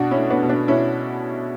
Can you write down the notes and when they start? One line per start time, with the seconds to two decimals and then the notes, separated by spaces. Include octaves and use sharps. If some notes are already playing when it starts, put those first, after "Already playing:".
Already playing: B2 D4 F#4
0.11 C#4 E4
0.17 A3
0.30 B3 D4
0.43 B2
0.49 B3 D4
0.68 B2 C#4 E4